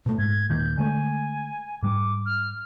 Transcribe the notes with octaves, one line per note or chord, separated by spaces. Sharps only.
B2 A3
G#2 G#6
D#1 D#3 A#3 G6
D3 G#3 A3 G#5
G#2 G3 D6
F6